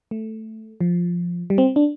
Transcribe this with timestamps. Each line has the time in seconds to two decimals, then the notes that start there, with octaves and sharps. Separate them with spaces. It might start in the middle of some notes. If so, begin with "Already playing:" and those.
0.11 A3
0.81 F3
1.50 G3
1.58 C4
1.76 D4